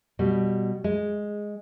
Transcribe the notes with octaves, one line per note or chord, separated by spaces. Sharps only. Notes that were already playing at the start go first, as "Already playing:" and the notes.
B2 G3
G#3